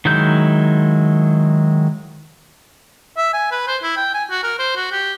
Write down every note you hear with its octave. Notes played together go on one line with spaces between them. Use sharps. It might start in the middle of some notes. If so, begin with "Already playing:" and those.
D#3 F#3 G#3 E4 G6
E5
G#5
B4
C5
E4
G5
G#5
F#4
A#4
C5
F#4
G4